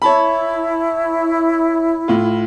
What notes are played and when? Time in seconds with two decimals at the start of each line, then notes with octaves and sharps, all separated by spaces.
0.02 E4 C#5 A5 B5
2.08 A2 F4